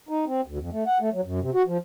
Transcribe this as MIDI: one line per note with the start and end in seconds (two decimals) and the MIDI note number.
0.09 0.25 63
0.26 0.41 60
0.46 0.58 38
0.58 0.70 41
0.73 0.84 57
0.87 0.98 78
1.00 1.10 57
1.13 1.21 54
1.25 1.40 42
1.41 1.50 48
1.54 1.62 66
1.67 1.78 53